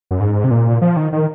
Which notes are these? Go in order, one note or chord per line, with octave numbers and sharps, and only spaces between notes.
F#2
G#2
C3
A#2
F3
D#3
D#3